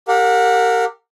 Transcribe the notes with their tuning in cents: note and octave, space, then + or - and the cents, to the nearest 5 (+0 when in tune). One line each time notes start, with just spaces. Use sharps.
G4 +0 A#4 -25 F#5 -40